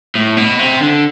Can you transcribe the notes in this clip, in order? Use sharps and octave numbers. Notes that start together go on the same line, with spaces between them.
A2
B2
C3
D3